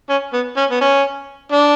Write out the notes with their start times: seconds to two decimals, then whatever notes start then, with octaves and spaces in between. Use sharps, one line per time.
0.09 C#4
0.33 B3
0.57 C#4
0.71 B3
0.81 C#4
1.52 D4